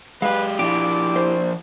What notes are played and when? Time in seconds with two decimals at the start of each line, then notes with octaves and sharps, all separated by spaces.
0.22 G#3 G4 B4 F5
0.59 F3 D4 E4 G4 D6
1.16 C5